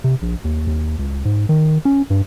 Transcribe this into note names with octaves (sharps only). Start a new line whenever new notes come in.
C3
A#1
D#2
D#2
C#2
G#2
D#3
C#4
G2